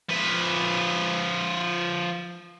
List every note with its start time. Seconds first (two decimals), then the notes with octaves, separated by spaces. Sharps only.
0.09 F3 B4